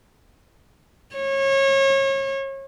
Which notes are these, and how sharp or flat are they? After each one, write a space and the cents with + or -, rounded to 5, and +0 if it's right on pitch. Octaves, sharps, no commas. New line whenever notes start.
C#5 -30